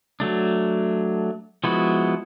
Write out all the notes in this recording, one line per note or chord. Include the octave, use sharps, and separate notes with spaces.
F#3 A3 D4
F3 G#3 B3 E4 F#4